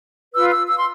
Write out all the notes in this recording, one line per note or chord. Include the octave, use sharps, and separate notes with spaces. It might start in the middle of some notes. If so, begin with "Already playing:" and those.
F4 B4 E6
E6
E6
C6